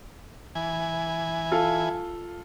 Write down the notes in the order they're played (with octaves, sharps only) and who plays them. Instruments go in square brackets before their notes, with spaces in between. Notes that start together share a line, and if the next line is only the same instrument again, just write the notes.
[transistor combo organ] E3 G#5
[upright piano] F4 A4